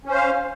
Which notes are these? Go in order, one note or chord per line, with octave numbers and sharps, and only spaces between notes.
C#4 C5 F5